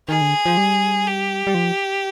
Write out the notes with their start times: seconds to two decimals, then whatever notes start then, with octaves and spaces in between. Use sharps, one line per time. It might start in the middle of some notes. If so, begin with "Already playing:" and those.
0.09 D#3 G#4
0.21 D3
0.46 F3
0.57 G3
1.07 G4
1.47 G3
1.55 F3